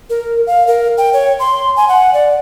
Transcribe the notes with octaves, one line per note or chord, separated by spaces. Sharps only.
A#4
F5
A#4
G5
C#5
C6
G#5
F#5
D5